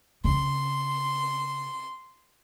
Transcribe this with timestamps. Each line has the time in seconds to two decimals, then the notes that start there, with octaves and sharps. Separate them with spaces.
0.24 C#3 C6